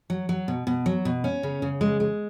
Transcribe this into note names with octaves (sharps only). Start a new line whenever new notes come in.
F#3
F#3
B2
B2
F#3
B2
C#4
C#3
C#3
G#3
G#3